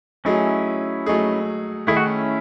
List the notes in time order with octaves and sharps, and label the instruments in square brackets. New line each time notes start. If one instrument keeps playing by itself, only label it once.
[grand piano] F#3 A3 D#4 G#4 [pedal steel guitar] C#4 E4
[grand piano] F#3 A3 D#4 G#4
[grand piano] D#3 A3 D#4 G#4 [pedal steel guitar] E4
[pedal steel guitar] F#4
C#4 E4